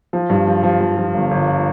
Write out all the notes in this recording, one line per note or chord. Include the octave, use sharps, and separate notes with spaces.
F3
G2
F3
F3
F3
F3
G1
G1